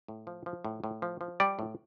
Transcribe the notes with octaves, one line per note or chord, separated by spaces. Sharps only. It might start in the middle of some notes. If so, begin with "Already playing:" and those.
A2
F3
F3
A2
A2
F3
F3
G3 D5
A2